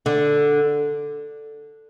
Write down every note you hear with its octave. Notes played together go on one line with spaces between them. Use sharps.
D3